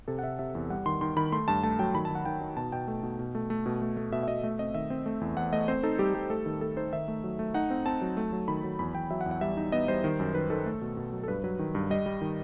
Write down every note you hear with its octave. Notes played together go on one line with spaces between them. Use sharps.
C3 A4
F#5
C3 E5
C3 E5
E2
G3 F#5
D#3 C6
D#3 C6
D#3 B5
A3 C6
G2 A5
A3 A5
F#3 G5
D#3 B5
A5
D#3
F#5
D#3 G5
D#4
B2 A5
B2 G5
A3
B2
B2
A3
A3
B2
A3
A3
B2 E5
E5
B2 D#5
A3 E5
C4 D#5
D#3 E5
C4
A3
E2
E2 F#5
A3 D#5
C4 C5
D#4 A4
G3 G4
G3 G4
A3 A4
D#3
A3 A4
D#4 C5
D#3 E5
A3
F#3
A3
D#4 F#5
C4
C4 A5
F#3
A3
F#3
D#3 B5
F#3
E2 B5
E2 G5
F#3 E5
F#5
E2
F#5
G3 E5
D#4
B3 D#5
G3 C5
D#3
F#2
D#3 B4
D#3 A4
A3
B2
B2
F#3
A4
G2 B4
F#3 B4
D#3
G2
G3 D#5
G3
D#3